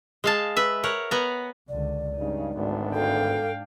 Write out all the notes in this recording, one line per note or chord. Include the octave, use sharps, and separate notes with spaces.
G#3 F5 A5
B4 E5
A#4 C#5 F#5
B3 F#5 G#5 A#5
C#2 D3 D5
G2 C#3 G#3 D#4
G#1 D2 G#2 B3 D4
A4 F5 G5